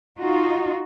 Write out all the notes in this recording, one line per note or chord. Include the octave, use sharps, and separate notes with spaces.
D#4 F4 F#4